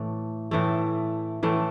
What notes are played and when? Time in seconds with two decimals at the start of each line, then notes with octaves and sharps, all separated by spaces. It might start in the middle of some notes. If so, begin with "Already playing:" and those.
Already playing: A2 E3 A3
0.51 A2 E3 A3
1.43 A2 E3 A3